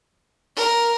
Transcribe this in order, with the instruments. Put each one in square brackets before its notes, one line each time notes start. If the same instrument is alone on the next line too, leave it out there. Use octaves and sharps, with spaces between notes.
[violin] A#4